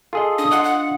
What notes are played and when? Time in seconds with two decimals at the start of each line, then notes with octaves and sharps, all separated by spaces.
0.13 F4 G#4 A4 D#5
0.38 D4 D#6
0.52 F4 D#5 F#5
0.64 F#5